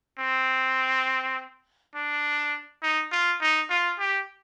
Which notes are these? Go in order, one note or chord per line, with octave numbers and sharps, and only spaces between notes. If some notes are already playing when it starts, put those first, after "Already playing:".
C4
D4
D#4
F4
D#4
F4
G4